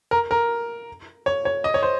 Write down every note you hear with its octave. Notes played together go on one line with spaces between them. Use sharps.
A#4
A#4
C#5
C#5
D#5
C#5
C5